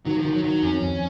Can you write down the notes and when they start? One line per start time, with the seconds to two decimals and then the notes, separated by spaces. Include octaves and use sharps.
0.06 D#3 F#3
0.18 F3
0.25 D#3
0.31 F#3
0.43 D#3 F#3
0.63 F2 C#4
0.82 F2